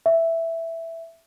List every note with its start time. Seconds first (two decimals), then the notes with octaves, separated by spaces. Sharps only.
0.06 E5